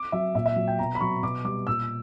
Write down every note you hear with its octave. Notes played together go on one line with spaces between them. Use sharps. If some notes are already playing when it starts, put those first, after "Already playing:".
Already playing: D6
F#3 E5
A#2 E5
E5
F#3
G5
B2 A#5
B5
F#3 C#6
B2 D6
G3 D6
A#2 E6